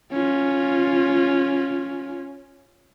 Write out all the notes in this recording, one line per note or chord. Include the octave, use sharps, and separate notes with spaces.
C#4 F4